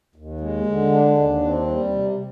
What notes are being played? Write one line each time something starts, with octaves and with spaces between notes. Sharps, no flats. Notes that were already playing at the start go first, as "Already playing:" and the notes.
D#2
G#3
D3
D4
D#2
C4
G3
C3